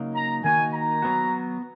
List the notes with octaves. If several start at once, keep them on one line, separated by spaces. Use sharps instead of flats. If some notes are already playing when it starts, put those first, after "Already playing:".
Already playing: C#3 F#3 A#3 D#4
A#5
D#3 A#3 D#4 F#4 G#5
A#5
F#3 B3 F#4